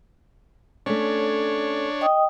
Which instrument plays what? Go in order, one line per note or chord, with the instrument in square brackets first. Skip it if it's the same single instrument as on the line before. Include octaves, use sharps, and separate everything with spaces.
[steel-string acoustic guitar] A3 C#4 [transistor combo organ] D4 C#5
[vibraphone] D#5 G5 D#6